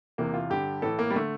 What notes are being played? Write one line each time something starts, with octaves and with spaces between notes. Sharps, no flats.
E2 C3 E3 A#3
F4
G2 D3 G4
A2 E3 A4
A#3
G3
D3 A3